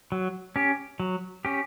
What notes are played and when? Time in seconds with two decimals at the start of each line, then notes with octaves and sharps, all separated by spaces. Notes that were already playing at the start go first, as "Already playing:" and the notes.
0.12 F#3
0.56 C#4 G4
1.00 F#3
1.45 C#4 G4